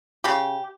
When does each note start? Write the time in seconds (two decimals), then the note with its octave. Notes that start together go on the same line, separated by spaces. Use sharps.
0.24 C#3 G4